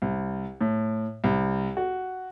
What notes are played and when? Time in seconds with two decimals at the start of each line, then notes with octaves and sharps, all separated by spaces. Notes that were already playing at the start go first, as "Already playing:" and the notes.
0.02 C2
0.61 A2
1.24 C2
1.77 F#4